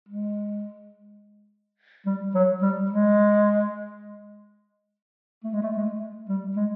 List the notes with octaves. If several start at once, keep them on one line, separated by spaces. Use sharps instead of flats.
G#3
G3
F#3
G3
G#3
A3
G#3
A3
G#3
A3
G3
G#3